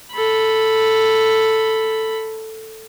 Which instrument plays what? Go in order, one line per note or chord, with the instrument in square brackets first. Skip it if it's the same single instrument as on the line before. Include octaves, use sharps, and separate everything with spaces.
[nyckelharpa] A4 B5